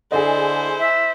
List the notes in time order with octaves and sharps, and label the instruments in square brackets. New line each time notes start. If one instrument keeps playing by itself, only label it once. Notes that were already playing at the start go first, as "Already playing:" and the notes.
[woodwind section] D3 [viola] E4 C5 [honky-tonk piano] G#4 D#5
[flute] E5